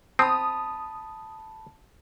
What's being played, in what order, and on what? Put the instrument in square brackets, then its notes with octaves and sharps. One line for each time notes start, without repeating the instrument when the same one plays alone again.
[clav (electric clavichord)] C4 [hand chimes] A5 B5 [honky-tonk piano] D#6